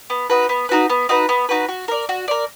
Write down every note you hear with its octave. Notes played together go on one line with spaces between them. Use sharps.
B3
D#4 F#4 B4
B3
D#4 F#4 B4
B3
D#4 F#4 B4
B3
D#4 F#4 B4
F#4
A#4 D5
F#4
A#4 D5